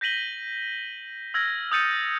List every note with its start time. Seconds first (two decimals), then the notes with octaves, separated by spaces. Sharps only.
0.01 G6 A#6 B6 D#7 F#7 G7
1.34 E6 F6 G#6 A#6
1.71 D#6 E6 G6 A6 C#7 D#7